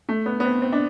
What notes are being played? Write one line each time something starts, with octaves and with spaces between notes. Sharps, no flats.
A3
B3
B3
C4
C4
D4